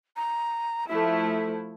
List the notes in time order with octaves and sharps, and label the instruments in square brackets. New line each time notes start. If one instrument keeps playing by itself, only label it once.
[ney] A#5
[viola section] F3 A3 E4 [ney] E5